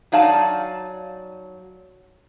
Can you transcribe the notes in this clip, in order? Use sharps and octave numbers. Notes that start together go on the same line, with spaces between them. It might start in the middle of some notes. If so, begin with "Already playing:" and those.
F#3 D#4 D5 F5 G#5 A5